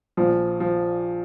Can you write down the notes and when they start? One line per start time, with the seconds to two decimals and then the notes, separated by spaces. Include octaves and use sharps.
0.17 A#1 A#2 F3
0.60 F3